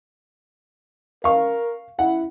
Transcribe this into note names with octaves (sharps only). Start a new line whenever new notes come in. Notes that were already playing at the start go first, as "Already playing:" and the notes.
A#4 F5 C#6
E4 F#5